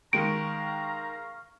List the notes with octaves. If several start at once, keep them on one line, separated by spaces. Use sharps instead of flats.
D#3 G#3 F5 A#5 C#6 F6 D7